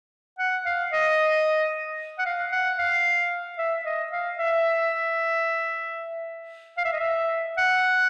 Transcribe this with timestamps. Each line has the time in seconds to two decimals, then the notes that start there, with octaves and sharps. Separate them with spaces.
0.39 F#5
0.66 F5
0.92 D#5
2.19 F#5
2.25 F5
2.52 F#5
2.79 F5
3.58 E5
3.85 D#5
4.12 F5
4.39 E5
6.77 F5
6.85 E5
6.93 D#5
7.00 E5
7.57 F#5